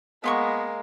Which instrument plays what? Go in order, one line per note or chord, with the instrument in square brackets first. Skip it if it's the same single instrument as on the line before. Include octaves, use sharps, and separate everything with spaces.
[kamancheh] G#3 A#3 [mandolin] B3 C6 C#6